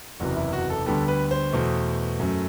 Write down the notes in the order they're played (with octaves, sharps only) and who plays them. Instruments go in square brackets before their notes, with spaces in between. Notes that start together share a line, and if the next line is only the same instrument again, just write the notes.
[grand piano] F#1 E2 C3 E3 B3 F#4
E4
F#4
A4
D2 D3 G3 B3 A4
B4
C5
E2 B2 A3
F#2 F#3 A3